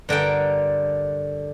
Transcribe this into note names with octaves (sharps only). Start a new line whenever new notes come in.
G2 D3 A#4 G5